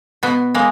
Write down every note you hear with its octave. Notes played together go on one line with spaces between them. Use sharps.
B2 B3
G#3 A#3